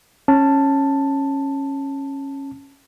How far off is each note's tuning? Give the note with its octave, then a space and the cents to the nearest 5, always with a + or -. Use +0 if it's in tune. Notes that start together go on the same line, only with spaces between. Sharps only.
C#4 -15 A5 +5